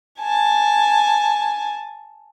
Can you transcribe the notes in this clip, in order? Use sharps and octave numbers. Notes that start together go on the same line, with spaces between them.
G#5 A5